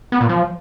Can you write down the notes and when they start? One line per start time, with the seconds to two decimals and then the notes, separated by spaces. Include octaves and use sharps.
0.12 B3
0.21 A#2
0.29 F3